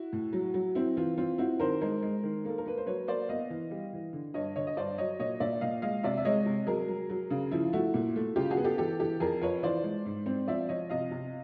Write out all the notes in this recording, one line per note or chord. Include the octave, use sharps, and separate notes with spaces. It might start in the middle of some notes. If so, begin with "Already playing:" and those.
Already playing: E4 F#4
A2
F#3
F#3
C4 E4
E3 F4
C4 F4
C4 E4 F#4
D#3 A#4 C5
G#3 A#4 C5
G#3
D#3
A#3 A4
A#4
A#3 B4
C5
F#3 B4 C#5
A#3 C5 D5
B3 D#5 F5
E3
G3
E3
D3
G2 C#5 D#5
D3 C#5 D#5
D#5
G2 C5 D5
F#3 C#5 D#5
A#2 C#5 D#5
A#2 D5 E5
A#2 D#5 F5
G#3 D#5 F5
C3 D5 E5
E5
G#3 C#5 D#5
C3
F#3 G#4 A#4
F#3
F#3
C#3
F3 E4
A3 E4 F#4
A#2
A3
C#3 F4 G4
F#4 G#4
B3
G4 A4
E3 G4 A4
E3 G4 A4
F2 G#4 A#4
F2 B4 C#5
E3 C5 D5
G#3
G#2
C4
F3 D5 E5
F3 C#5 D#5
C3 D#5 F5
C3